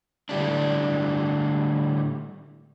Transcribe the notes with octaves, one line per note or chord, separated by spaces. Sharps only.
A2 D3 G3 D4